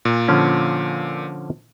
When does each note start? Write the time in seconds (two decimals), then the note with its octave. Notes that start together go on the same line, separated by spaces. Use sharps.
0.05 A#2
0.28 D3 F3 C#4